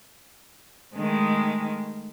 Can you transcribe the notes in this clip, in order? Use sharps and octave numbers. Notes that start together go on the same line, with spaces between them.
D#3 G#3 A3